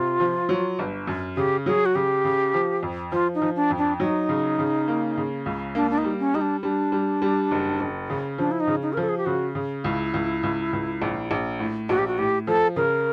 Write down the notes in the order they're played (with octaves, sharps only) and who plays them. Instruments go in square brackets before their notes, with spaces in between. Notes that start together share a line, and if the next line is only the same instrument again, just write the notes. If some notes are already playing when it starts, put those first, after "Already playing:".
Already playing: [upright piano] C3 [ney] F4
[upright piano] F3
F#3
G1
F#2
[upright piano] C#3 [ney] G4
[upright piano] F#3 [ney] G#4
[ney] F#4
[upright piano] C#3 [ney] G4
[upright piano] C#3
F3
F2
[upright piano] F3 [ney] F4
[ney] D#4
[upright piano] F3
[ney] D4
[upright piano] F2
[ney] D4
[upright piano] F#3 [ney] D#4
[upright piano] C#3
C#3
A#3
C#3
C#2
[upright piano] A#3 [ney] D4
[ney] D4
D#4
[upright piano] G3
[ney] C#4
[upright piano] G3 [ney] D#4
[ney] D4
[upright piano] G3 [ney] D4
[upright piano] G3
G3
F#1
F#1
C#3
[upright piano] F3 [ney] D4
[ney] E4
D#4
[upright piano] C#3
[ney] D#4
A#4
[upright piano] F3 [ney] A4
[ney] G#4
G4
[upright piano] C#3 [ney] F#4
[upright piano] C#3
[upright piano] C#2 [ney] E4
[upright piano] C#2
C#2
C#2
A#1
A#1
A2
[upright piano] A#1 [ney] F#4
[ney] G4
F#4
[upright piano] A2 [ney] G4
[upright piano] F3 [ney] A4
[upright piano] C#3 [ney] A#4